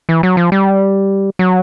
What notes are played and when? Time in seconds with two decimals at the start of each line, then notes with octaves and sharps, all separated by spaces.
0.09 E3
0.23 F#3
0.37 F3
0.52 G3
1.39 F#3